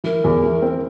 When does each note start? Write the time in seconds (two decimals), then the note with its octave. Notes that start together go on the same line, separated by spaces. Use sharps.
0.04 E3 A#4
0.24 E2
0.44 E3
0.62 C4